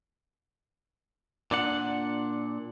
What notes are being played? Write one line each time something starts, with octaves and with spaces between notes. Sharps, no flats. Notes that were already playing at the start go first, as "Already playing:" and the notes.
A#2 D4 F#5